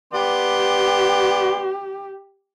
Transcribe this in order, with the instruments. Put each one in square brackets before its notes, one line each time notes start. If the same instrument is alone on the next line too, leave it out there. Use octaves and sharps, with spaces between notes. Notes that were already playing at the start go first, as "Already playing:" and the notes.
[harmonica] B3 D5 C6 [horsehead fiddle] G4